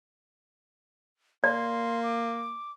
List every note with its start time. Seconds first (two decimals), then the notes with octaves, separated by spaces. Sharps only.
1.44 A#3 D5 C6
2.03 D6